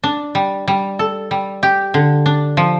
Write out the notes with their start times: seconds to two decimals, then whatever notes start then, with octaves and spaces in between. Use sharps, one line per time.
0.04 D4
0.35 G3
0.68 G3
0.99 A4
1.31 G3
1.63 G4
1.94 D3
2.26 D4
2.57 F3